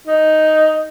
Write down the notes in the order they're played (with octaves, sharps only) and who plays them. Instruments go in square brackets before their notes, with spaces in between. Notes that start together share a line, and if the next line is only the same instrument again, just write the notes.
[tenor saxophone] D#4